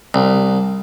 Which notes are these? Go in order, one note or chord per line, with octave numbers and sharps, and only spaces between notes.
C2